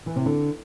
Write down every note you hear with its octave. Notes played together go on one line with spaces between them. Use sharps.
E3
C3
D3